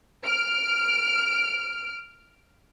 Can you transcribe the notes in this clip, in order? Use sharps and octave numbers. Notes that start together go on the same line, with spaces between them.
F6 D7